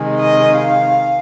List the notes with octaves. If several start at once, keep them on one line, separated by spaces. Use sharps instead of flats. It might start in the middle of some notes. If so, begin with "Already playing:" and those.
Already playing: C3 D#3 G#3
D#5
F5